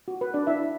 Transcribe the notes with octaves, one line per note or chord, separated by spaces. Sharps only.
F#4
B4
D4 D5
E4 E5